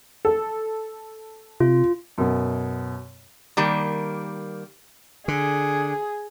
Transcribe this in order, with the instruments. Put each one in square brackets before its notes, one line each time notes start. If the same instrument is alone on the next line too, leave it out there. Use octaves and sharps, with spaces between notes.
[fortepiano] A4
[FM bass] C3 [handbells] F4
[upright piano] F#2 B2
[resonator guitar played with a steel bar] D#3 G3 A#3
[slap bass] D3 [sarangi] G#4